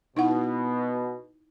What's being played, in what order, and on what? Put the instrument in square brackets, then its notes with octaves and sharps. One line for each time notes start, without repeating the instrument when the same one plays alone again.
[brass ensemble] B2 [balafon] D#4 E4 F#5